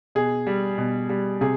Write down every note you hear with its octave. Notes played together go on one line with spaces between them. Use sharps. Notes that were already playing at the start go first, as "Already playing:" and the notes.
B2 G#4
G3
B2
G3
C3 G#4